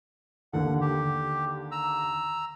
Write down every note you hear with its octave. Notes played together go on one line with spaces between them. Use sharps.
D#2 D3 F#5
G4
A#5 E6